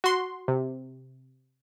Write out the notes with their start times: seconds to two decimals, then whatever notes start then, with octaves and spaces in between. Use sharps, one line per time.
0.04 F#4 C6
0.48 C3